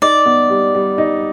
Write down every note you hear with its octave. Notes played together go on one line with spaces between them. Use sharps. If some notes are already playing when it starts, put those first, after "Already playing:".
D#4 D5
B3
G3
G3
D#4